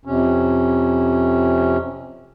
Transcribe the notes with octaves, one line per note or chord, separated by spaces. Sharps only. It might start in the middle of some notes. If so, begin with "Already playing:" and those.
F2 C3 C#4